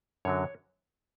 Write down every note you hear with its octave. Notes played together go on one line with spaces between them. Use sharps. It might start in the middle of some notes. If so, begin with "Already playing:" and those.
F#2 D3 F#3 C#5